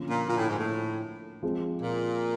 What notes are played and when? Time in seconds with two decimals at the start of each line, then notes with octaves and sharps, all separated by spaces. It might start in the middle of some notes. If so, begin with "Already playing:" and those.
Already playing: D3 F3 A#3 C#4 F4
0.08 A#2
0.27 A#2
0.38 A2
0.49 G#2
0.59 A2
1.43 F3 G#3 C4
1.82 A#2